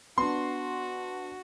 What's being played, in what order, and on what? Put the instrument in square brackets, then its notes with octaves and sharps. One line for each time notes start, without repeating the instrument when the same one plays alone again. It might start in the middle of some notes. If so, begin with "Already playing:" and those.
[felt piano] B3 D4 [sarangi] F#4 [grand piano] C6